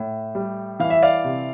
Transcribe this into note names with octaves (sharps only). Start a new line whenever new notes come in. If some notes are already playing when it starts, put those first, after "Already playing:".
Already playing: A2
G3
E3 F5
E5
D5 F5
C3